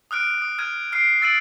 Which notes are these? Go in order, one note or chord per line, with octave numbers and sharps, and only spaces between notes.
D#6 F6 F#6 D7
D#6
F6 G#6 D#7
F6 C7 D7
E6 A6 C7 D7 D#7 F#7